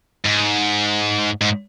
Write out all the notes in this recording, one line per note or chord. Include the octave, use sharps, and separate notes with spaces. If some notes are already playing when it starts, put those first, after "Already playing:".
G#2
G#2